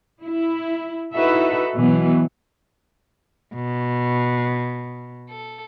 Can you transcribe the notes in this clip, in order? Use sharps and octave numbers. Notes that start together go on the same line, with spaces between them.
E4
D#4 E4 F#4 A4 B4 E5
B2 E3 F#3 B3
B2
A4